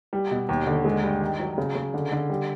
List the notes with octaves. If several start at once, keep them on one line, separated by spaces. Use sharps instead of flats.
G3
B2
D#2
D3
G#3
G2
D#3
F#3
C#3
C#3
D3
D3
G3